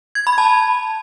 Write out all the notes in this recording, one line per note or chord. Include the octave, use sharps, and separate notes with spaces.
G#6
B5
A5